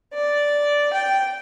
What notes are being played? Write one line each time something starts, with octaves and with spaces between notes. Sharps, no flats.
D5
G5